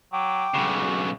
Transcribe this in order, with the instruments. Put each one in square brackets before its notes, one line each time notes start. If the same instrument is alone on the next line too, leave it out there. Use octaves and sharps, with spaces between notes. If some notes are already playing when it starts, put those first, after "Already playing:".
[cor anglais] F#3 [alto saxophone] G5 [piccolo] D6
[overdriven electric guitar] B1 C#3 [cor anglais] F#4